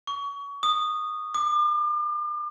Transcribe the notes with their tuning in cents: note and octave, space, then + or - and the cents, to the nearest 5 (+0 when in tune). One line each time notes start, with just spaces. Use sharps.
C#6 +30
D#6 -15
D6 +40